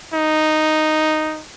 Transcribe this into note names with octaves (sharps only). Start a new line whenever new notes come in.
D#4